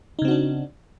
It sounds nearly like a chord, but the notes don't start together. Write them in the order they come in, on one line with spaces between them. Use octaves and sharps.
D#4 C#3 C4 F#4 D4